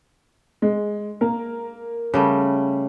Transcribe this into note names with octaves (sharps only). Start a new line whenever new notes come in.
G#3
A#3 A#4
C#3 G3 A3